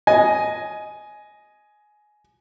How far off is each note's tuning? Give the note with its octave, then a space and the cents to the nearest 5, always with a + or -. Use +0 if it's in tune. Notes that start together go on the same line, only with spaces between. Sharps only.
D#5 +0 G#5 +15